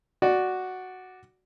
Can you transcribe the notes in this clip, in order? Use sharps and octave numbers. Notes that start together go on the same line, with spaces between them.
F#4 D5